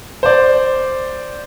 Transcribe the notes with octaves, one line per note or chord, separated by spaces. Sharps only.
C5 D5